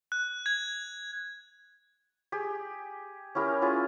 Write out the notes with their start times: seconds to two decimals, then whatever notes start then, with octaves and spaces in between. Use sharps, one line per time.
0.12 F#6
0.46 G#6
2.32 G4 G#4
3.35 C#4 E4 G4 A#4
3.62 C#4 E4 F4 G#4